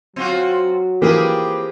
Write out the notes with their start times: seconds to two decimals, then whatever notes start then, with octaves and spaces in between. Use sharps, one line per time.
0.16 F#3 C4 F4 F#4
1.02 E3 F3 A#3 C4 G4 G#4 B4